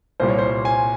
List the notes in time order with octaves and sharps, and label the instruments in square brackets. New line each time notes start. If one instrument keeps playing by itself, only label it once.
[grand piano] C2 A#2 G3 C5
C#5
C5
G#5